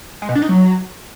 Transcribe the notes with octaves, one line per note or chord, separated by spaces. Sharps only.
G#3
B2
D4
D#4
F#3